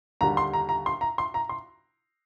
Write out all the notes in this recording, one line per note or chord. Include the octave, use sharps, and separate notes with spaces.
D#2 D3 G3 A#5
C6
A#5
A#5
C6
A#5
C6
A#5
C6